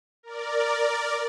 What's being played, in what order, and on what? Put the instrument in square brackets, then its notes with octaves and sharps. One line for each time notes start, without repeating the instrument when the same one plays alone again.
[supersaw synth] A#4 D5